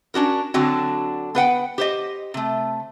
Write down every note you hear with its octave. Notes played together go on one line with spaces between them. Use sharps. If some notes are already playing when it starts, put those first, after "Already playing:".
C#4 D4 F#4 A#4
D3 F#3 C4 D4 F#4
B3 B4 F#5 G5
G4 C5 D#5
C3 A3